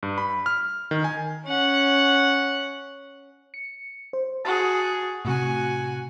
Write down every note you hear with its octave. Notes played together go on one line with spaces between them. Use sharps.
G2
B5
F6
D#3
G#5
C#4 F#5
C#7
C5
F#4 G#4 A5 A6
A2 C3 F#4 G#5